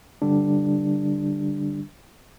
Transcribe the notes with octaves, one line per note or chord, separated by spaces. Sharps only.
D3 G3 D4